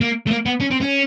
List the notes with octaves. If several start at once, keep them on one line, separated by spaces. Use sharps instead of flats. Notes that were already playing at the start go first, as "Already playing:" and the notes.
A#3
A3
A#3
B3
C#4
C4
C#4